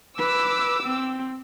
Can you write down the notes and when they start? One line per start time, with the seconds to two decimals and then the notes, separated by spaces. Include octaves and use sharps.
0.18 B4 D6 E6
0.83 C4